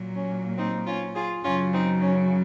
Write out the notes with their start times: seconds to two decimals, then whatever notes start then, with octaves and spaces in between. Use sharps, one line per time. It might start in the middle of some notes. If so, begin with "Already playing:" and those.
Already playing: A#2 F#3 A#3
0.15 C#4
0.57 C4 D#4
0.86 C#4 F4
1.15 F4 G#4
1.44 F#2 C#3 F#3 C#4 F4
1.73 C4 D#4
2.02 C#4